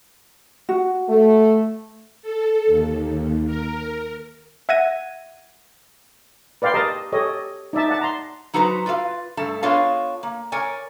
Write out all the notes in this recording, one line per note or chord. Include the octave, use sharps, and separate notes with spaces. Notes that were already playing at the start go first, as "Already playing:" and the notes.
F#4
A3
A4
D#2
A#4
E5 F#5 G#6 A#6 D#7
B4 D5 F5 G5 C6
G4 A#4 D#5 A5 A#5
G4 A4 C#5 D#5
D#4 D5 E5 A5
D5 F#5 A5
A#5 C6
F#3 D#4 F#4 B4 C5 A#5
F4 B4 D5 E5 F5
G2 A3 A5
B3 D4 F4 C#5 D#5 F5
A#3
A#4 C#5 D5 G#5